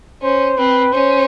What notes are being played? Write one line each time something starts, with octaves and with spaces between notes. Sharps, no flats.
C#4 C5
C4 B4
C#4 C5